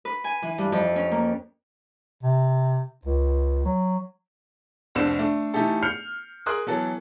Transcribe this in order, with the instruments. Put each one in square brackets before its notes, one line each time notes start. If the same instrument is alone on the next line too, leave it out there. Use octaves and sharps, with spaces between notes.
[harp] B4
G#5
E3
G2
F2
C#4
A#3
[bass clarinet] C3
C#2
F#3
[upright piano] F1 C2 D4 C5 E6 E7
A3 D4
E3 A3 D#4 E4 G4 A4
F6 G6 C7 C#7 F7
G#4 A#4 C6 D#6 F#6
E3 F#3 B3 A4